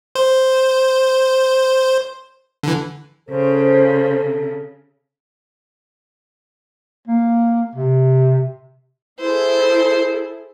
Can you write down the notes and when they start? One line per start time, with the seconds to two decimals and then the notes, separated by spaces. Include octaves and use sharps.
0.15 C5
2.63 D3 E3
3.29 C#3 A4 C5
7.07 A#3
7.75 C3
9.20 E4 G#4 A4 C5